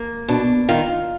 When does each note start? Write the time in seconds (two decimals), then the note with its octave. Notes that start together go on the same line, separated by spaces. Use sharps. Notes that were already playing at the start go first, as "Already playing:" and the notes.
Already playing: A#3
0.28 B2 D4
0.69 D#3 F4